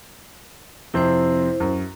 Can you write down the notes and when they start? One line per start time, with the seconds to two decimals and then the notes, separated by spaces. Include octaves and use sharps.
0.94 F2 C3 C4 E4 C5
1.60 F#2